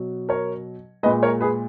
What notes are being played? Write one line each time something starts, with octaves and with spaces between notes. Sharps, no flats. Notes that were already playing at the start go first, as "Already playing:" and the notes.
Already playing: B2 F#3
A#4 C#5
A#2 G#3 B4 D#5
A#4 C#5
G#4 B4